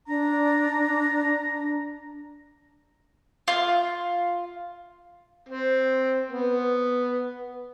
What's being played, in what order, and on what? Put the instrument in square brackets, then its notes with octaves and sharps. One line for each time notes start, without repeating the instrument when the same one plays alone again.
[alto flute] D4 [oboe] A#5
[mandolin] F4
[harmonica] C4
B3